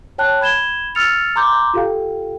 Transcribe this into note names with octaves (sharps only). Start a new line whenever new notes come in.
C#5 G5 A5 F#6
B5 G#6 E7 G7
E6 F6 A6 C#7 F7
A#5 C6 D6 G6
F4 G4 A4 F5 G5